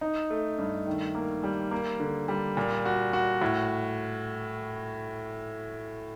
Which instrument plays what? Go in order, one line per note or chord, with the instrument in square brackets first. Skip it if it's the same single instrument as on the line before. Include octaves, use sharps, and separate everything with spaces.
[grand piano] D#4
A3
G2
D#3
A#3
G3
A#3
D3
G3
A#2
F#4
F#4
A2